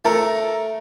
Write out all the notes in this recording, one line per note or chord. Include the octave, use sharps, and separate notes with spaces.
A3 A4 A#4